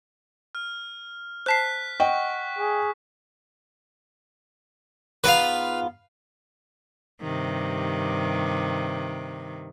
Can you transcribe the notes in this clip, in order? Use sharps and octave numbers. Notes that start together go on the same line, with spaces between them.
F6
C5 A5 F#6 B6 C7
D#5 F#5 G5 C#6
G#4
G#2 B3 F4 B4 F5
G2 C3 D#3